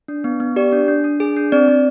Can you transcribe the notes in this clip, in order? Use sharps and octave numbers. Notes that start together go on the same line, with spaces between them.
D4
B3
B3
G4 D5
D4
D4
D4
G#4
D4
C4 D5
C4